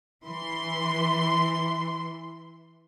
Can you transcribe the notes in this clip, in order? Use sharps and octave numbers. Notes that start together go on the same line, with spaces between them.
E3 C6